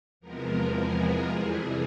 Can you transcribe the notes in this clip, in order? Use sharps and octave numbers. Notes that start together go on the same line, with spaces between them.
E2 C3 F3 G#3 B3 A#4
G#4
F2 C3 E3 G3